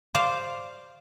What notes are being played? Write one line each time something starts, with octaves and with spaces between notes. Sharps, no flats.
C5 D5 F5